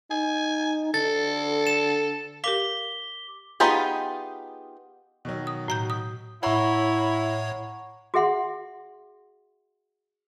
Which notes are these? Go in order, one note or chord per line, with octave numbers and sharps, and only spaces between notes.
D#4 G#5
D3 A4 A6
E7
G4 A#4 F5 D6 B6 G7
B3 D#4 F4 G4 G#4
B2 D#3 F#3
D#6
A2 A#5 G6
D#6
A2 E4 C#5 F#5 A#5 C#6
F#4 G#4 E5 F#5 C6